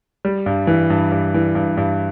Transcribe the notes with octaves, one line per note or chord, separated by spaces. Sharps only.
G3
G2
E3
G2
G2
E3
G2
G2